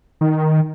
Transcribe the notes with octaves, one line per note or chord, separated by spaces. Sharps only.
D#3